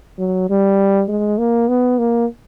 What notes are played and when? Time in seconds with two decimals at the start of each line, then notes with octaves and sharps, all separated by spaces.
0.19 F#3
0.50 G3
1.09 G#3
1.38 A#3
1.68 B3
1.99 A#3